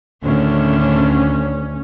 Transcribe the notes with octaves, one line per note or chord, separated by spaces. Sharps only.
D2 A2 D3 D#3 C#4